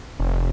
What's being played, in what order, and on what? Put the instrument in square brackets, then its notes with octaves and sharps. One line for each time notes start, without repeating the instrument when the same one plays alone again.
[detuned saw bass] F1